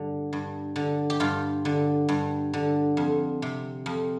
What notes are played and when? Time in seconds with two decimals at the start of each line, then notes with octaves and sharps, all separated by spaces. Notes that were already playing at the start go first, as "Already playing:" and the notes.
Already playing: G2 D3
0.33 G2
0.76 D3
1.10 G4
1.20 G2 F4
1.65 D3
2.09 G2
2.53 D3
2.97 F2
3.42 C3
3.86 F2